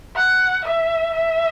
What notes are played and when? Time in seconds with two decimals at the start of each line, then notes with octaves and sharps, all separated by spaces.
0.16 F#5
0.64 E5
1.13 E5